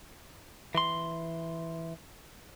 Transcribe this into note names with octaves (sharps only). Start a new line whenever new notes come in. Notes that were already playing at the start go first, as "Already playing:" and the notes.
E3 C6